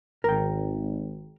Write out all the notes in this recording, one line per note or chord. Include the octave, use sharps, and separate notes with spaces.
G#1 A#4 G5